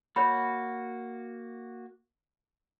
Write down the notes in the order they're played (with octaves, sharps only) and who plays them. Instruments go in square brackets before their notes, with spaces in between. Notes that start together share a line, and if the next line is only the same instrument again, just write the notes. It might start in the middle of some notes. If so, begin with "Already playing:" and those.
[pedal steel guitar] A#3 F#4 [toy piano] C#5 B5